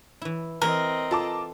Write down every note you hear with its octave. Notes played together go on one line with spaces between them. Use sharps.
E3 E4
E3 C4 A#4 D#5
F4 A4 A5 D6